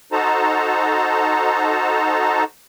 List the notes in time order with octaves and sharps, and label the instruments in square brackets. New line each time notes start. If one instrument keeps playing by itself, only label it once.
[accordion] D#4 F#4 A4 C5 A5 A#5